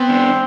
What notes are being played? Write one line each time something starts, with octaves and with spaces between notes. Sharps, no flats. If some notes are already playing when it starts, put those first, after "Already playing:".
Already playing: B3 C4
D4